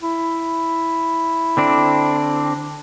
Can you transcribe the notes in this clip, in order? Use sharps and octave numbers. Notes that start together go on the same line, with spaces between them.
E4
D3 C4 D4